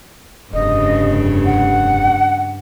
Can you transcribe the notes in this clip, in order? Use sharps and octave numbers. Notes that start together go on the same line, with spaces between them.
F1 G2 C#3 D#5
F#5